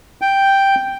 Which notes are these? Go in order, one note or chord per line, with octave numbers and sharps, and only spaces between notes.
G5